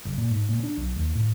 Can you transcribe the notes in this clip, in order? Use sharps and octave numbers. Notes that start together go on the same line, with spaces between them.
F#1
A#2
G#2
A#2
D4
B1
D#2
A2